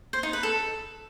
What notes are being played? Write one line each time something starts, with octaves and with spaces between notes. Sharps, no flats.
C5
D#4
B4
A4